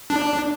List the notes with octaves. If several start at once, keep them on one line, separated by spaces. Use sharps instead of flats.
D4